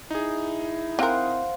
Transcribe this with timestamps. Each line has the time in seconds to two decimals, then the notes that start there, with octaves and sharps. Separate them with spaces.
0.11 D#4 E4 G#4
0.99 C4 A#4 C5 F5 F#5